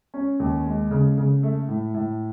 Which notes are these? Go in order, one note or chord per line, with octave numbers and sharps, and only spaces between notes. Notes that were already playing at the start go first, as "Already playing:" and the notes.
C#4
D#2
G#3
C#3
C#3
A3
A2
A2